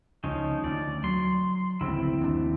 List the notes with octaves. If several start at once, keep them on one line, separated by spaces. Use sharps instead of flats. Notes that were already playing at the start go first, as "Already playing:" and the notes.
C#2 F3 C#4 D#4
D2 D5
F#3 C6
G1 C#2 F3 C4 E4
D#2 C3 D4